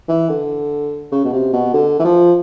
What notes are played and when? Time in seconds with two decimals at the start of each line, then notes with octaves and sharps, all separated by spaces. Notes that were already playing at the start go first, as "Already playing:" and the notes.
0.09 E3
0.29 D3
1.12 C#3
1.25 B2
1.33 C3
1.53 B2
1.74 D3
2.00 E3
2.05 F3